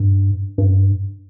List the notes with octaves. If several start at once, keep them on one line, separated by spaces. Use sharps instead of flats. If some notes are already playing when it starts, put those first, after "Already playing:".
Already playing: G2
G2